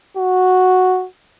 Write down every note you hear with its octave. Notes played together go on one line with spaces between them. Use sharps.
F#4